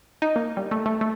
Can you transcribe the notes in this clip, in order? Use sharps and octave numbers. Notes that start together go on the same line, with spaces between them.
D#4
A#3
G3
A3
A3
A3